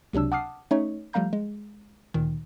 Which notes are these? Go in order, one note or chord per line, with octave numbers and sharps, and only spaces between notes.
C#2 C3 F#3 D4 E6
F#5 A5 D6 D#6 F6 C7
A3 C#4 D#4 C#5
F3 G3 A3 F5 A#5 G6
G#3
D2 A#2 D#3